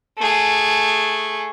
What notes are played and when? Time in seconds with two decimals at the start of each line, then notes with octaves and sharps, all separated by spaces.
0.19 A3 G#4